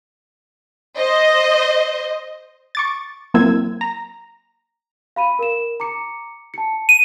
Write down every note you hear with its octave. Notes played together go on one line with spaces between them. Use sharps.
C5 D#5
C#6 D6 A6
F#3 A#3 C4 E4 E6 G#6
A#5
F5 B5 D#7
A#4 E7
A#5 D6 C#7
A5 C#7
D#7